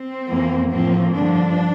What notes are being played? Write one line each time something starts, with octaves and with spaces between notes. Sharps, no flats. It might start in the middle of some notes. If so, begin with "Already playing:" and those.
Already playing: C4
F2 E3 A#3
A2 F3 A#3 C4
G2 D3 F3 D4